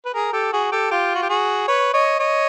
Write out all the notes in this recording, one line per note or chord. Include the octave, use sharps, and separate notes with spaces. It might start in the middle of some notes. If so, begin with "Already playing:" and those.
B4
G#4 A#4
G4 A4
F#4 G#4
G4 A4
F4 G4
F#4
G4
F#4 G#4
B4 C#5
C#5 D#5
C#5 D#5